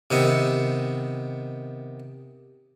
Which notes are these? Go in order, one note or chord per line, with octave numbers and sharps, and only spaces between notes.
C3 D#3 B3